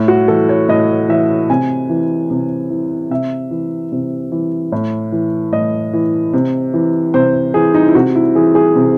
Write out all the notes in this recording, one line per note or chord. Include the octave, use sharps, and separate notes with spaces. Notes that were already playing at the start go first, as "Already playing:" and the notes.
Already playing: A2
F#4
E3 A4
C#5
A2 D#5
E3 E5
C3 G#5
E3
C3
E3
C3 E5
E3
C3
E3
A2
E3
A2 D#5
E3
C3
E3
C3 C5
E3 G#4
D#4
E4
C3 F#4
E4
E3 G#4
G#4
C3